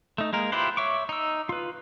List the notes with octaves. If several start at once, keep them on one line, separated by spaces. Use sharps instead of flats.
A3 D#4
G#3 A#3 A#4
E4 F4 G4 B4 C5
C#5 E5 C#6 D6
D#4 E6
F4 B4